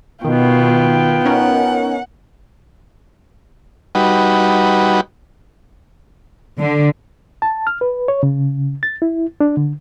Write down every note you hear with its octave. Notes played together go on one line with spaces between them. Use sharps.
B2 D#3 B3 F4 G5
C#4 D#4 A#4 F#5
G3 D#4 F#4 B4
D3
A5
F6
B4
C#5
C#3
A6
E4
D4
D3